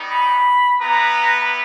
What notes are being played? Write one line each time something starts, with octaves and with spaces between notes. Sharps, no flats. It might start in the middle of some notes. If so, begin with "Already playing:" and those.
Already playing: G3 B3 D#4
B5
B3 E4 G4 B4 A#5